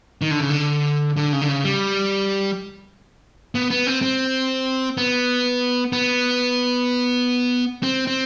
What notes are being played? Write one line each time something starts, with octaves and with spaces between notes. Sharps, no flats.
D#3
D3
C#3
D3
D3
C#3
D3
C#3
G3
B3
B3
C4
C4
B3
B3
C4
C4